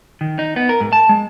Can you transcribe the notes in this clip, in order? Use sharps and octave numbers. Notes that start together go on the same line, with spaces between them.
D#3
D#4
B3
A#4
G#2
A5
G#3